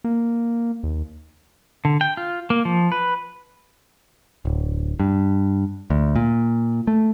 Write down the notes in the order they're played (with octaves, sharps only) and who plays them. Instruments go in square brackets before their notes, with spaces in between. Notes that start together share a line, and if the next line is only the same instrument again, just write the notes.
[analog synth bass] A#3
D#2
[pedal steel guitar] D3
G5
F4
A#3
F3
B4
[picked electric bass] D1
G2
D2
A#2
A3